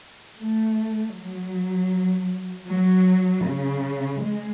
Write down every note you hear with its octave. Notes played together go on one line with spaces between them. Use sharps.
A3
F#3
F#3
C#3
G#3